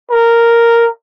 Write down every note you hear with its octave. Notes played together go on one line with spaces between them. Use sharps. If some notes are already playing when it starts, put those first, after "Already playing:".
A#4